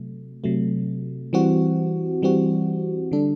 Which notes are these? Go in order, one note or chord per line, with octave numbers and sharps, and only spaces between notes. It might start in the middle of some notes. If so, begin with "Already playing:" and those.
Already playing: C3 F#3 A3
C3 F#3 A3
E3 G3 C4 F#4
E3 G3 C4 F#4
D3 G3 D4 A4